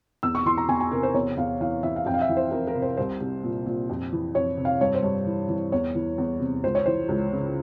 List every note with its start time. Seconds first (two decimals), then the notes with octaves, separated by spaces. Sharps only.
0.23 E2 E6
0.35 C#6
0.46 E3 C6
0.58 A#5
0.68 E2 G#5
0.80 G#5
0.91 C3 A#4
1.03 C5
1.14 E2 C#5
1.37 E2 F5
1.60 E3 F5
1.83 E3 E5
1.96 F5
2.06 F2 G5
2.14 F5
2.21 E5
2.29 E3
2.37 C5
2.51 F2 A#4
2.67 A#4
2.75 C3
2.82 C5
2.97 C2 C5
3.20 C2
3.43 A#2
3.66 A#2
3.90 F2
4.13 E3
4.34 F2 C#5
4.57 C3
4.65 F5
4.81 G2 C#5
4.94 C5
5.03 G2 C#5
5.26 E3
5.49 E3
5.72 E2 C#5
5.95 E3
6.18 E2
6.40 C3
6.63 C#2 C5
6.75 C#5
6.86 E3 C5
7.09 C#2
7.32 C#3